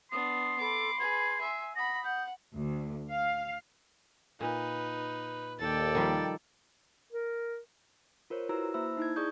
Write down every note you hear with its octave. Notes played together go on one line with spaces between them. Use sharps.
B3 D4 C6 D#6
A4 B5 D6
G#4 B4 G#6
E5 G#5 E6
F#5 B5 D#6 A#6
F#5 G6
D2
F5
A#2 D#4 B4
D#2 A4 D5 G5 A6
D#3 F3 G3
A#4
F4 A#4 C5 C#5
E4 F#4 B4 A#5 E6
A#3 E4 C5 E5 B5 E6
D#4 E4 G#6
G#4 D5 C#6 D#6 G6